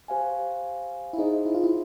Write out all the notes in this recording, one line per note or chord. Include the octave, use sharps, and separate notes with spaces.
G4 C5 F5 G#5
E4
D#4 G#4 C5 D#5
E4
F4
E4